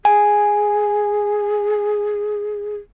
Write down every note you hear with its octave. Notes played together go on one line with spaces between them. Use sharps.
G#4 G#5